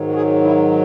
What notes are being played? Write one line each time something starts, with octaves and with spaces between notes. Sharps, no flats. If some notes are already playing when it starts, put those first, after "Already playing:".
Already playing: G#2 D#3 F#3
F#4
G#4
E4